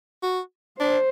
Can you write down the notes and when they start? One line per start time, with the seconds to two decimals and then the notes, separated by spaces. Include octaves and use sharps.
0.23 F#4
0.79 D4 C5